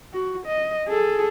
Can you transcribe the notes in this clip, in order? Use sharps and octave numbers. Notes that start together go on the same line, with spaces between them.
F#4
D#5
G#4 A4